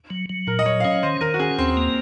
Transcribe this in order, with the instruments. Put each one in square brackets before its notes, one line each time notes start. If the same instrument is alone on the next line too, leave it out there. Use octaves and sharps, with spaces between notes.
[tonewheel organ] F#3
F#3
[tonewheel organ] A#2 [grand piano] A#4
[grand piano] D#5
[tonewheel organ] F#3 [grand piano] C#5
[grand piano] F5
[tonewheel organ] C#4 [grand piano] D#5
[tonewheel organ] D#3 [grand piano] C5
[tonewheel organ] D#3 [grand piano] A#4
[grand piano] F#4
[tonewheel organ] C#4 [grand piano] G#4
[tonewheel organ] D#2 [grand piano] C4
[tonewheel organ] A#3